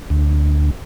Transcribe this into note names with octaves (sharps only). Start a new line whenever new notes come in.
D2